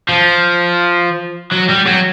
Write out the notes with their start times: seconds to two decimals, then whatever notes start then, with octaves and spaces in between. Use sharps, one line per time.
0.09 F3
1.52 F#3
1.70 G3
1.88 F#3